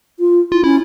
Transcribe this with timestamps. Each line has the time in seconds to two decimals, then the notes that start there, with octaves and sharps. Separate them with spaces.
0.20 F4
0.52 E4 F4
0.64 C#4 E4